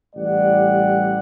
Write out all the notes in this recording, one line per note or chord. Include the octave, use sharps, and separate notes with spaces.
A1 G3 D5 F#5